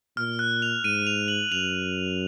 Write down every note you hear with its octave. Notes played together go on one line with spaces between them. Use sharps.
A#2 F6
F#6
F7
G#2 D#7
F7
F#7
F#2 F7